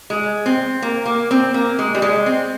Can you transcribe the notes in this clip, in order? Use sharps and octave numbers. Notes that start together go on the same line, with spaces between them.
G#3
C4
A#3
A#3
C4
A#3
G#3
G3
G#3
C4